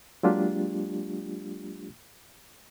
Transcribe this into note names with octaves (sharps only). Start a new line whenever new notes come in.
F#3 G#3 A#3 D4 F4 G4